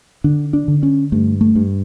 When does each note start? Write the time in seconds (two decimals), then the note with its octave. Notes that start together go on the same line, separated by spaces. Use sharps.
0.24 D3 D4
0.53 D4
0.68 D3
0.83 C#4
1.12 G2 A3
1.41 A3
1.56 G2